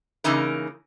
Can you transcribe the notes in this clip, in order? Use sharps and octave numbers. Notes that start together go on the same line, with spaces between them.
C#3 E3 A#3 D#4 A#4